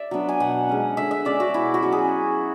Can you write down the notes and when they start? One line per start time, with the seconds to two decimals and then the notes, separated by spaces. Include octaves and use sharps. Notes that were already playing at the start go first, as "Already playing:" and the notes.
Already playing: D5 E5
0.11 F#3 B3 D4
0.29 G#5
0.40 B2 F#5
0.69 G#3 C#4
0.97 D3 E5
1.11 E5
1.25 G#3 C#4 D5
1.40 F#4
1.54 B2 E4
1.74 F#4
1.83 F#3 C#4
1.92 G#4